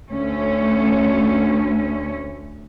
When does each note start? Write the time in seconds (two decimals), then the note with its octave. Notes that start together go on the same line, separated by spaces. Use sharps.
0.10 D2 A3 C#4